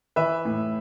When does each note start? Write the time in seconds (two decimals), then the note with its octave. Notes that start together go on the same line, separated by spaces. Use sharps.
0.16 E3 B4 E5
0.45 A2